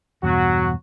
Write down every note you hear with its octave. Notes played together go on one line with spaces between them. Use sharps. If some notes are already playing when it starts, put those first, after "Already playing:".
E2 G2 B2 F#3 F#4